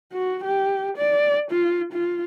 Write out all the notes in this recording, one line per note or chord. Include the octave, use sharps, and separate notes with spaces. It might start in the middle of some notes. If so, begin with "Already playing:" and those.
F#4
G4
D5
F4
F4